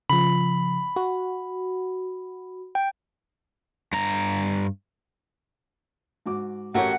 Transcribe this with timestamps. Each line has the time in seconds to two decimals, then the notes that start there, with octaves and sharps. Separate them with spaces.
0.10 C#3 F3 B5
0.96 F#4
2.75 G5
3.93 G2 A#5
6.26 G#2 F#4 D6
6.74 A1 F#3 F#4 G4 A#4 C#5 F#5